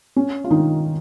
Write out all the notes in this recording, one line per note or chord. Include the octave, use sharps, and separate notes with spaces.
C#4
F4
D#3 D#4